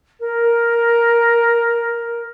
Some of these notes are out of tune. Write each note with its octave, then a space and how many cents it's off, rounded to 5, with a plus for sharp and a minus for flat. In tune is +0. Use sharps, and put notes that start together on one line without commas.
A#4 +5